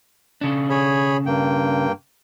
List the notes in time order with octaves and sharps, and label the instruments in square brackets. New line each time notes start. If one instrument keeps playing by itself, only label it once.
[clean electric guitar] C#3 D4
[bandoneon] G#4 C#5 B5
G2 A#3 G5